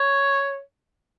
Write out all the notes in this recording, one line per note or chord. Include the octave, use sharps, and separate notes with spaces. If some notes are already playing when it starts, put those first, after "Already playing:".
Already playing: C#5